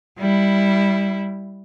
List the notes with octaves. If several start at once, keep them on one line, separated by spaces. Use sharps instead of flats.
G3 E4